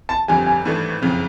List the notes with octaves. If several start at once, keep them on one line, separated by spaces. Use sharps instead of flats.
A5
G1 F2 D3 G3 G#5
G#5
G#1 G2 E3 A3 D4
F#1 F2 C#3